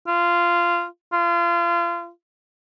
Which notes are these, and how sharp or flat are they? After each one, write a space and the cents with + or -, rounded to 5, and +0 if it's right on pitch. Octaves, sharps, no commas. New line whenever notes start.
F4 -15
F4 -30